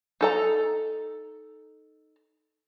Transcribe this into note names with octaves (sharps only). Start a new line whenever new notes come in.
D#4 A4 A#5